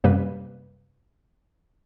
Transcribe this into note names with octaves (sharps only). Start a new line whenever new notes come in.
F#2 C3 G3 A#3 B4